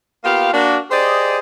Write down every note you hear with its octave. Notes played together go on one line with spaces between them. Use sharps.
A#3 B3 F4 G4 F5
A#3 D4 F#4
G4 G#4 C5 D5 D#5